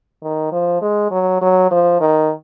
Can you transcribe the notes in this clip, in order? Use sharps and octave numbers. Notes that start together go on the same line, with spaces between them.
D#3
F3
G#3
F#3
F#3
F3
D#3